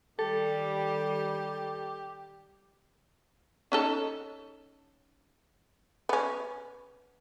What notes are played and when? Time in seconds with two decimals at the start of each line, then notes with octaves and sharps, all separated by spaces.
0.19 D#3 G3 G4 A4
3.72 C#4 D#4 A4
6.09 B3 C#4